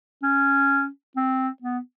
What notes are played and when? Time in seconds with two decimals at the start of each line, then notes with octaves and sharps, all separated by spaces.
0.23 C#4
1.16 C4
1.62 B3